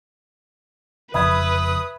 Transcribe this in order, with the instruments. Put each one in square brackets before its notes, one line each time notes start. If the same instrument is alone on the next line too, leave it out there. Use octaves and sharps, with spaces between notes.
[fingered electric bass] F1 F2 C#3 [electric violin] B4 [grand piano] E5 B5 G#6 [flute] D#6